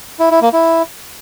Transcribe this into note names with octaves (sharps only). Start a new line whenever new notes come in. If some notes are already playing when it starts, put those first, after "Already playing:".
E4
E4
A#3
E4